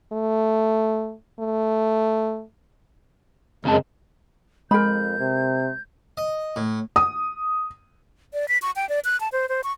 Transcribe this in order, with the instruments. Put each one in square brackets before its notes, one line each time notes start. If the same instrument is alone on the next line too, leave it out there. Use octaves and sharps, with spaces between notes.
[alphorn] A3
A3
[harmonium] F#2 G#3 [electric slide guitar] C#3 C4 A5
[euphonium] F2 [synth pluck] G#3 [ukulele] A#4 B5 [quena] G6
[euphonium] C3
[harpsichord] D#5
A2
[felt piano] D#6
[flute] D5
B6
C#6
G5
D5
F#6
A5
C5
C5
C#6